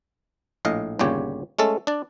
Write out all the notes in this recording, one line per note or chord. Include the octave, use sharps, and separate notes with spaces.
A#1 A2 D#5 F5
G1 D#2 A#2 C#3 G4 C#5
G#3 A3 C#4 A4
D4 D5